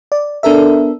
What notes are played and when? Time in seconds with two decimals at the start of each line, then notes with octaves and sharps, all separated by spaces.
0.12 D5
0.43 B3 D4 A4 A#4 E5